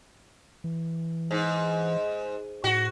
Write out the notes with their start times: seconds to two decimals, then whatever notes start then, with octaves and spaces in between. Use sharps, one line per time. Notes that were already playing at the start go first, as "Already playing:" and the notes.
0.64 E3
1.31 G#2
2.64 A2 F#4